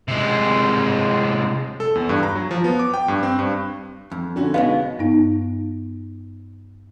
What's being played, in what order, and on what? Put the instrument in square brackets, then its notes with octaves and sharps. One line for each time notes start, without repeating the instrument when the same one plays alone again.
[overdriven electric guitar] C3 G#3
[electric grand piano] A4
E2
G2
A#5
F#3
F3
B3
D6
G5
G2
C4
G2
[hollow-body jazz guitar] F2
[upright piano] D3 C#4 F#4
[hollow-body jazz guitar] B2 G#3 B3 [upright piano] D#4 [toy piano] F5
[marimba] G2 B3 D#4